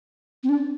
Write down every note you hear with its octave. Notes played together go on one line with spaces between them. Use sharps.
C4
D4